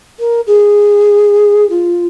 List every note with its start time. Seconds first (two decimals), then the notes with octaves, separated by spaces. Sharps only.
0.19 A#4
0.46 G#4
1.69 F4